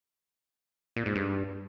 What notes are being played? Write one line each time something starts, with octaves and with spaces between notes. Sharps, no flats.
A#2
G#2
G2